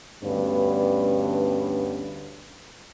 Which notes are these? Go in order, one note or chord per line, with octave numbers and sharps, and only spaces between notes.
D2 G2 B3 C#4 D4 B4